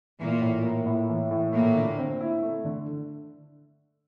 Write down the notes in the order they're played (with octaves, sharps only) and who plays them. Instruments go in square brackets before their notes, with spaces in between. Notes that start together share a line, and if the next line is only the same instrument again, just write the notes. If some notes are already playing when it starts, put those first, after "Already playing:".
[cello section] A#2 A#3 [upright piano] E3
[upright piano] A2
A#3
A2
E3
A2
[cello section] A#2 A#3 [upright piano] A3
[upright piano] D3
C4
E4
A3
D3